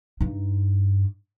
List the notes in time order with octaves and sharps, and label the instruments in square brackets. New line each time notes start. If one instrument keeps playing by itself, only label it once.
[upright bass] G2 D#4